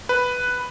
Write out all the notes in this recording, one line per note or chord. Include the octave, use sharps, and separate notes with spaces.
B4